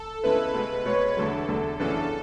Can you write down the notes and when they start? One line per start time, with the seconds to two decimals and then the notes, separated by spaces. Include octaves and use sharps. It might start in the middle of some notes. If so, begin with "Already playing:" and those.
Already playing: A4
0.23 C#3 G#3 B3 E4 B4
0.54 B2 G#3 B3
0.85 B2 G#3 B3 C#5
1.17 E2 D3 F#3 A4
1.48 E2 D3 F#3
1.80 F#2 C#3 E3 B3 D4 A4